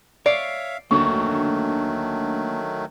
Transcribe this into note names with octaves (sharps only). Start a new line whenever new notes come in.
C#5 D5 E5 F5 C7
D2 D#3 F#3 A3 A#3 D4 A4 C#6